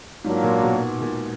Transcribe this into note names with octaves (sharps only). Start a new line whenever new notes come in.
G#2 F#3 A#3 D4 F4
A#2
B2
A#2